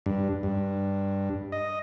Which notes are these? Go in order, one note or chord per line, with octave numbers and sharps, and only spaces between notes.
G2
G2
D#5